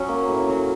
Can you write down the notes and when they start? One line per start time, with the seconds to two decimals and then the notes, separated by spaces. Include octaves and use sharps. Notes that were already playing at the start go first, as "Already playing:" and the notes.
Already playing: F#3 C#4
0.08 A#3
0.28 A2
0.48 F#3